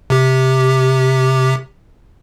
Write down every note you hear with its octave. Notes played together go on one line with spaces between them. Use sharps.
C3 G4